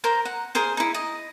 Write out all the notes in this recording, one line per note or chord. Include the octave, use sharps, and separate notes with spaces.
A#4 C5 A#5
F#5
G#4 A#4 C5 F5
D#4 E4
D#5